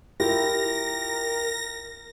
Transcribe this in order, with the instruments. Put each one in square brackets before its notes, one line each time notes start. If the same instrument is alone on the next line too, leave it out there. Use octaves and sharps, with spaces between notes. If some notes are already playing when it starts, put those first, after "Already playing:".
[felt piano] E4 F4 G4 [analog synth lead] A#4 [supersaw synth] A#6